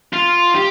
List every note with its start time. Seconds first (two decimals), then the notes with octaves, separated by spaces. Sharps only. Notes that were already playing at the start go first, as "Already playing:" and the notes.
0.13 F4
0.55 G4